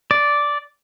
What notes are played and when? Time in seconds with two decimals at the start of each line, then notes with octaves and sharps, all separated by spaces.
0.11 D5